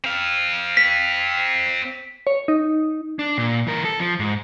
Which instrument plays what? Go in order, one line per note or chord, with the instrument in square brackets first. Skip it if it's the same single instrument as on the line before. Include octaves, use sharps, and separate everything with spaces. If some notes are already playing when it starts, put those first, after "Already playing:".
[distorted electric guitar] C4 F5
[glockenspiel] B6
[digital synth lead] C#5
D#4
[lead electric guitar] D4
A#2
E3 A#4
A4
F3
G#2